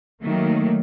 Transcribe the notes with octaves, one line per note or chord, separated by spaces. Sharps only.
D#3 F#3 A3 A#3